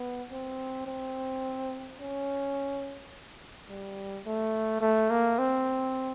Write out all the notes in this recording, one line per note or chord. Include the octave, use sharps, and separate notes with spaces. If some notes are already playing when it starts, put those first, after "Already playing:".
Already playing: B3
C4
C4
C#4
G3
A3
A3
A#3
C4